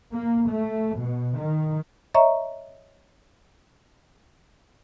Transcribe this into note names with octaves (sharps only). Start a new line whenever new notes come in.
A#3
A3
B2
D#3
C#5 D#5 E5 A#5 C#6